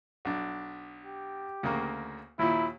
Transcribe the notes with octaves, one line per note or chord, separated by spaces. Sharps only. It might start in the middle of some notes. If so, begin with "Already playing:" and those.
B1 D4
G4
D2 C#3 A#3
D#2 A#2 E4